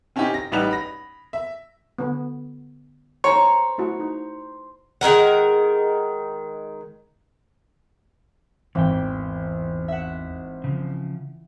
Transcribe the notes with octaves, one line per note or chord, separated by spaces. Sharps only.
C4 C#4 D#4 E4 G4
A#6
A1 G3 D#4 B4 F#5 F7
B5 A#6
E5
D3 B3
C5 C#5 A#5
A3 E4 F#4
D#4
D#3 G#3 A#4 F#5
G#1 E2 E3 G5
E5 F#5
C#3 F3